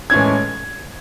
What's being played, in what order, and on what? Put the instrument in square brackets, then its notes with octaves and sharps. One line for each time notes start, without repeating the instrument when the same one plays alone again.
[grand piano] A2 E3 G#3 C#4 G#6